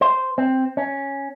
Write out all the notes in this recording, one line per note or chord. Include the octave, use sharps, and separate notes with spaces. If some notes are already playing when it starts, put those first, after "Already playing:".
C5
C4
C#4